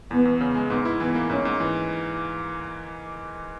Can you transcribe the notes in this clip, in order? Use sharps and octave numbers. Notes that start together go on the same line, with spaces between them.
E2 B3
E2
C#3
G#3
G#2 B3
E4
E3 B3
A#3
G#2 C#4
G#2
E3